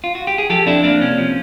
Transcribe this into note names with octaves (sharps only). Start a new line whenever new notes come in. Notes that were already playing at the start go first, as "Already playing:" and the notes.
F4
F#4
G4
G#4
F3 G4 A4
F2 D4 E4
A#3 D4
C3 C#4
F3